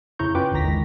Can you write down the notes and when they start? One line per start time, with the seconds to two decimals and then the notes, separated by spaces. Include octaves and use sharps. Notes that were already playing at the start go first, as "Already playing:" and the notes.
0.19 F2 C#3 E4 A#5 C#6 G6
0.35 F#2 C#4 F4 B4 G5 D6
0.52 G#1 D#2 D3 A#5 A#6 B6
0.65 D#3 G#3